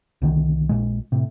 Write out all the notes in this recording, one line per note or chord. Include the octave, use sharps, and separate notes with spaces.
C2 D3 D#3
A#1 A#2 G#3
A2 C3